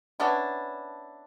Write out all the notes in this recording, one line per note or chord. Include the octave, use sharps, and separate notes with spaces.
B3 C#4 D4 E4